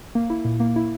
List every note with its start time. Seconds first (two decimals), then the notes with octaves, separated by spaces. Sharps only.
0.15 A#3
0.30 E4
0.45 A#2
0.60 A#3
0.76 E4